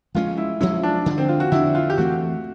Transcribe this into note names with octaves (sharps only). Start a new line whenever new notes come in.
F3 G#3 C#4 F4
E4
F3 G#3 C#4 E4
D4
D3 F3 A#3 D4
C4
F4
F#4
D3 F3 A#3 D4 E4
F4
G4
E3 A3 C4 F#4